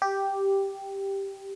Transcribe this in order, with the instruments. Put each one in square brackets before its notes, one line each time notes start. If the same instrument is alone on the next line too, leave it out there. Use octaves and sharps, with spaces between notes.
[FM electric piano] G4